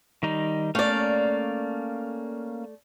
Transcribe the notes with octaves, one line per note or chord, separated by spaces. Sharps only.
D#3 G3 D#4
A3 A#3 C#4 D5 F5